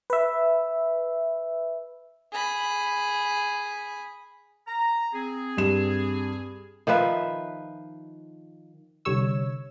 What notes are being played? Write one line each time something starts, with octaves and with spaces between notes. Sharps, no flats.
B4 E5
G#4 B5
A#5
C4 G#4
G2 E7
D#3 F3 B4 E5
C2 D3 G3 C#5 E6